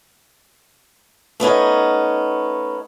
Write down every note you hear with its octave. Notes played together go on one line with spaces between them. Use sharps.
A3 B3 C#4 D#4